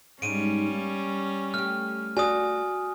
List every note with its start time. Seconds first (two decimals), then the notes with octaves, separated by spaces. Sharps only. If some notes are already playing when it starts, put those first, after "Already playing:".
0.22 G#2 G3 G#3 C#4 D#4 D7 D#7
0.72 A#3
1.54 A3 G4 F6
2.17 F#4 D5 G#5 D#6